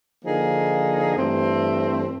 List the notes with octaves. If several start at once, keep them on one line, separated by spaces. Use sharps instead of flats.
D3 F3 A#3 D#4 G#4
G2 E3 A3 C4